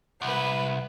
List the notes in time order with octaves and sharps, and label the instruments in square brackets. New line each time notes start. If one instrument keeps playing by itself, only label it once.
[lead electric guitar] C2 [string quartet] B4 F#5